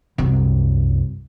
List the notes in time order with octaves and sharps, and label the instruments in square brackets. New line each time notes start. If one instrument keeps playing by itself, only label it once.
[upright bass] C2 F#2